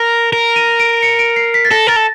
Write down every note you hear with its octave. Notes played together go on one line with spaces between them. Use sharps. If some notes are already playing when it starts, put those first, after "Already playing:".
Already playing: A#4
A#4
D#7
D7
C#7
D7
C7
B6
A6
A4 A#6
A#4 A6
A4